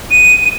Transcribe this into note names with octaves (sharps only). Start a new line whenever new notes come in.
D#7